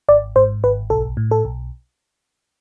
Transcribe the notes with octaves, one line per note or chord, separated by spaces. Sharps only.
G#1 D5
G#2 C5
G#1 B4
B1 A4
A2
A4
B1